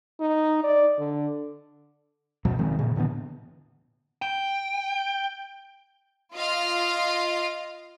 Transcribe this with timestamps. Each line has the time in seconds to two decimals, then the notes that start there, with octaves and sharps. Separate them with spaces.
0.20 D#4
0.63 D5
0.98 D3
2.45 F#2 B2 F3 F#3
2.59 F1 D#3 G#3 C4
2.79 A#2 C#3
2.96 A2 D3 E3 B3
4.22 G5
6.34 F4 D#5 F5